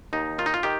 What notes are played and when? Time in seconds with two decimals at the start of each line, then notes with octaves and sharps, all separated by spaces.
0.13 D#2 D#4
0.38 D#3 F4
0.46 D#4
0.54 F4
0.63 D#3 G4